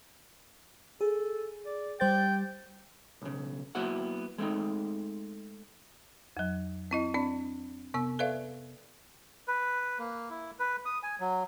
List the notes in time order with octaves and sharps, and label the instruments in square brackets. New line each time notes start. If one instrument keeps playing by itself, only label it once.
[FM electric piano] G#4 [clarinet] A4
[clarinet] D5
[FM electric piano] G3 C5 A6 [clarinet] G5
[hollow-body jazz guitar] B1 C#3
F#3 A#3 B3 E4 F#4 F#5
G#3 A3 C4 D#4
[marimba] F2 F#3
C4 E4 D#5
C4 D4 D5
C3 B3 E6
A4 B4 D5 E5 F5
[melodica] B4
A#3
E4
B4
D#6
G#5
F#3